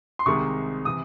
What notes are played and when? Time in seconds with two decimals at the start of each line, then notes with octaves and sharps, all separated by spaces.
0.19 C6
0.26 C2 C3 D#3 G#3 C#6
0.85 C3 E3 D#6